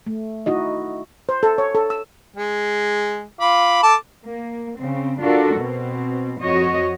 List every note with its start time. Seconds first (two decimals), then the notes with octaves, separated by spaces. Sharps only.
0.07 A3
0.46 D#4 E4 F#4 D#5
1.29 C5
1.43 A4
1.58 C#5
1.75 A4
1.90 E6
2.36 G#3
3.40 F4 B5 D6
3.83 A4 A5 D6
4.22 A#3
4.77 C#3 C4
5.21 D4 F4 F#4 A4 A#4
5.55 B2 C4
6.41 F2 F#4 C#5 D#5